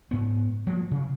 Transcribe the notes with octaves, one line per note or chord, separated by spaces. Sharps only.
G#2 B3
F3 G#3 A#3
C3